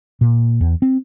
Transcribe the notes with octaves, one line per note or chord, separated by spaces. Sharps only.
A#2
E2
C4